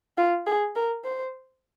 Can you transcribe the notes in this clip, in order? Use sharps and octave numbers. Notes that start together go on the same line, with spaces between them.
F4
G#4
A#4
C5